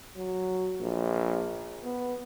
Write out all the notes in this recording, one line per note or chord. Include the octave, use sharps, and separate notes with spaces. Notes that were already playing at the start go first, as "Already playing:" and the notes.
F#3
A#1
B3